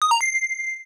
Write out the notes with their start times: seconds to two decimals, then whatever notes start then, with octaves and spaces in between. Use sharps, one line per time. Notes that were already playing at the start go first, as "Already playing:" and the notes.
0.02 D#6
0.11 A#5
0.21 C7